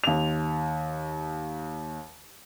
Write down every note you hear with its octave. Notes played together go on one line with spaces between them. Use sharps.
D#2 F7